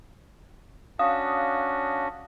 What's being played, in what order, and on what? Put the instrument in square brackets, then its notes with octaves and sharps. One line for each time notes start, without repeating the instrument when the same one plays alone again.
[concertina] C#4 D4 F#4 [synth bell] F5 D#6